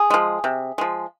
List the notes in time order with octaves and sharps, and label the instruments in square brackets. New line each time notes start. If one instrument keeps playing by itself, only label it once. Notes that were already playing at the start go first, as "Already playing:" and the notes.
Already playing: [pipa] G#4
F3 G#3
C3
F3 G#3